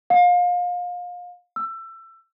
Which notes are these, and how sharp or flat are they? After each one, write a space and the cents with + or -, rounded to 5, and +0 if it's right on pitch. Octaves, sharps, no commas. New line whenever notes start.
F5 +30
E6 +20